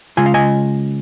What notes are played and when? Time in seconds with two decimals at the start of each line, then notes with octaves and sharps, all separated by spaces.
0.17 C#3 G#3 F4 G#5
0.26 F5
0.34 D#5 G#5